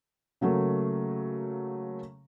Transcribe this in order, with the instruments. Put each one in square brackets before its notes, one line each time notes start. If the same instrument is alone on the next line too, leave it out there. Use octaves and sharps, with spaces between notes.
[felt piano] C#3 F#3 A3 A#3